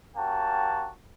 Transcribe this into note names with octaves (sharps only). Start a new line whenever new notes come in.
A#3 C#4 F#4 G4 G5 A5